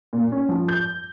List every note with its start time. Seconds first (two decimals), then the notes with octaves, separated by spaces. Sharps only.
0.13 A#2
0.32 C#4
0.49 F3
0.68 G6